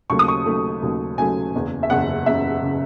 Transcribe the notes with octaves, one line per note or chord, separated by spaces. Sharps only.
D#2 C#3 F#3 A3 C#6
D#6
C#6
D#2 C#3 F#3 A3
D#2 C#3 F#3 A3
D#2 C#3 F#3 A3 G#5
F#1 E2 C#3
E5
F#1 E2 C#3 F#5
F#1 E2 C#3 E5
C#3